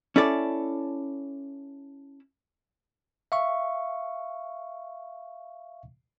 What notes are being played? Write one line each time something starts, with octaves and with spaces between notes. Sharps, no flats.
C#4 E4 A4 D5
E5 F5 C#6